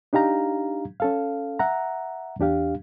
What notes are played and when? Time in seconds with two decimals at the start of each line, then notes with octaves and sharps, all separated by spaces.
0.13 D4 D#4 G4 F5 A#5
1.00 C#4 A4 F5
1.60 E5 F#5 A#5
2.39 E2 D4 G4 F5